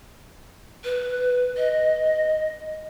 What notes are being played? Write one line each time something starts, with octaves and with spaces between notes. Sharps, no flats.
B4
D#5